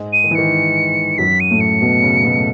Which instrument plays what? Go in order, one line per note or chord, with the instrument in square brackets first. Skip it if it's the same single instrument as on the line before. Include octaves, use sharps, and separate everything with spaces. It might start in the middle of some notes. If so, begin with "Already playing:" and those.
Already playing: [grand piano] G#2 G#3
[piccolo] D#7
[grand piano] D#3
E3
[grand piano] D#3 [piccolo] C#7
[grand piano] F#2 F#3 [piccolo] B6
[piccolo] D#7
[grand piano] A2 A3
[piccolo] C#7
[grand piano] B2 B3
C#3 C#4
B2 B3
A3